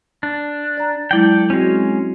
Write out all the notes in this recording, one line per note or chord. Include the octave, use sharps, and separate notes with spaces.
D4
D5 A#5
F#3 G#3 E4 A4 D5 G5
G#3 C4 C#4 F#4